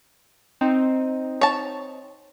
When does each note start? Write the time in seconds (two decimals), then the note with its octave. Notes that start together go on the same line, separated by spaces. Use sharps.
0.61 C4 D#4
1.41 C#5 A5